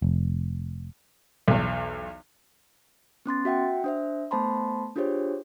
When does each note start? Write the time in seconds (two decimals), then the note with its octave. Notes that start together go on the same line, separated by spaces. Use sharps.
0.02 F1
1.48 B1 E2
3.26 B3 C#4 C6 A6
3.45 F#4 E5 F#5 G5
3.84 D4 C5 E5
4.31 A3 B3 C5 A5 B5 C6
4.96 D4 F4 G4 G#4 C5 C#5